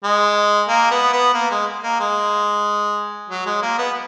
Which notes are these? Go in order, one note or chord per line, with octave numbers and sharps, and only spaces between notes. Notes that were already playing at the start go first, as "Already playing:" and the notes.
G#3
A#3
B3
B3
A#3
G#3
A#3
G#3
F#3
G#3
A#3
B3